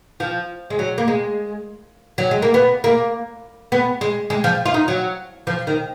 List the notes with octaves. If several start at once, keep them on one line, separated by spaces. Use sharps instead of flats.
F3
G#3
F#3
A#3
G#3
F#3
G#3
A#3
B3
A#3
B3
G#3
G#3
F3
F4
D#4
F#3
F3
D#3